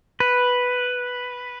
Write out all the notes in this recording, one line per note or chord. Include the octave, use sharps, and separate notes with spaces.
B4